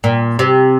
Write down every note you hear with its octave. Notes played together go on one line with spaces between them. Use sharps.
A#2
C3